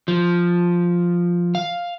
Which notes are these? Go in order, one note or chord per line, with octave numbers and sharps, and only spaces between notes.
F3
F5